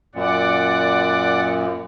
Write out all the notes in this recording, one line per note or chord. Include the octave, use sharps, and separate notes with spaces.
F#2 A#2 D5 F#5